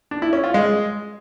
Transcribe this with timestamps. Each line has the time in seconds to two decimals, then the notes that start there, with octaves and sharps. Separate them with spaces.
0.11 D4
0.22 E4
0.33 C#4
0.44 F4
0.54 G#3